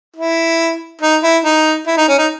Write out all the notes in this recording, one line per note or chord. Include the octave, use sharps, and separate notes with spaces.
E4
D#4
E4
D#4
E4
D#4
C#4
D#4